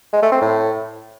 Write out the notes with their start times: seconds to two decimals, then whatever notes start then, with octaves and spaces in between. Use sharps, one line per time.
0.13 G#3
0.22 A3
0.32 C4
0.41 A2